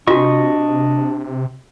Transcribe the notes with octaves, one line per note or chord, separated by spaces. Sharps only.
C3 D4 F4 F#4 D#5 C#6